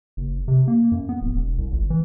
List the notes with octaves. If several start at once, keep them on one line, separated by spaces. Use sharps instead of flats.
F#1
C3
A#3
F#2
B3
D1
E1
C2
G1
E3